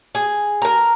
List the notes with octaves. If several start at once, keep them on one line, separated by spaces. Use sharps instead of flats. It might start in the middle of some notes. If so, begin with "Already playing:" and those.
G#4
A#4 A#5